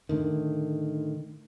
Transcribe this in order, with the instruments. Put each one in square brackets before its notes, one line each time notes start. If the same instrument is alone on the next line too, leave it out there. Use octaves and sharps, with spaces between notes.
[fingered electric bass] A2 D3 D#3